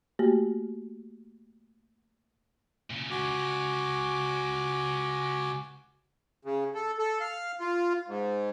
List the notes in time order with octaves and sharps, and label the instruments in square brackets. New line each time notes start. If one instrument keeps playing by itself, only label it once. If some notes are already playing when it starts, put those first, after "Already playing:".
[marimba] A3 A#3 F#4 G4
[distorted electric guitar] A#2 C#3
[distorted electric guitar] C#2 [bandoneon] F#4 G#5 D6
[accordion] C#3
A4
A4
F5
F4
G#2